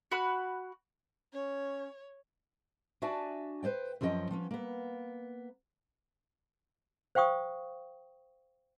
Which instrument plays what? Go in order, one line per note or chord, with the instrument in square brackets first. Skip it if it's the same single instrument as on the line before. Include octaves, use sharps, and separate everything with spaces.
[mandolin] F#4 B5 F#6
[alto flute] C#4 [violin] C#5
[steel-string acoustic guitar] D4 F#4 D5 E5 G#5 A5
B4 C5 D5 G5
F#2 F3 C#4 A#4 D#5 G5
F3 B3 C#4
A#3 B3
[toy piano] C5 F5 G5 C#6 D#6